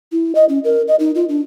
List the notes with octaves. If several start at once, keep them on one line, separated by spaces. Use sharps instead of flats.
E4
D#5
C#4
A#4
D#5
D#4
F4
D4